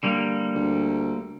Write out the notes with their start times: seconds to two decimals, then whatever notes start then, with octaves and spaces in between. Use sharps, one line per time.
0.03 D3 G3 A#3
0.55 D2